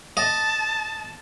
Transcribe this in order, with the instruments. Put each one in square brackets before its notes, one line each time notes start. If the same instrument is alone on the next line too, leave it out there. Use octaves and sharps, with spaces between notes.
[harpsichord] D#5 [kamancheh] A5